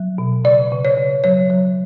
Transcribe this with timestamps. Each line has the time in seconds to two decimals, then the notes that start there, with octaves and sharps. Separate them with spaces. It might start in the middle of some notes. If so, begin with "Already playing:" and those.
Already playing: F#3
0.18 B2
0.44 C#3 D5
0.72 C#3
0.85 C#5
0.97 C#3
1.24 F#3 C#5
1.50 F#3